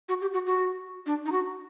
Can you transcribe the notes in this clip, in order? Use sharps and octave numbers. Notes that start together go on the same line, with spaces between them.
F#4
G4
F#4
F#4
D4
D#4
F#4